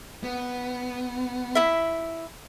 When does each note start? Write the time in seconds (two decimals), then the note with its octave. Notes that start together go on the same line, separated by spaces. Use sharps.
0.23 B3
1.55 E4 E5